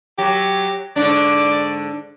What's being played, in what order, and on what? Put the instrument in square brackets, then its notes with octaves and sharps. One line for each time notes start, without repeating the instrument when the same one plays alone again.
[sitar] F#3 [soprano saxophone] G4
[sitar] G#2 D3 D4 [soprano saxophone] D5